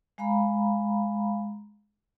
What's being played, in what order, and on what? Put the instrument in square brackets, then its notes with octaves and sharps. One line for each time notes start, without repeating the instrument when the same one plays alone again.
[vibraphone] G#3 F5 A#5 B5